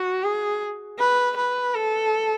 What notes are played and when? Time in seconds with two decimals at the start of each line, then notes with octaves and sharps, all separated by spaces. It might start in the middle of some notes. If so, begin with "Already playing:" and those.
Already playing: F#4
0.23 G#4
0.99 B4
1.37 B4
1.75 A4